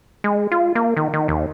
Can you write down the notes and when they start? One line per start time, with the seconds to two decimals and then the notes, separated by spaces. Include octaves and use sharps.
0.24 G#3
0.52 F4
0.75 A#3
0.97 D#3
1.13 D#3
1.28 D#2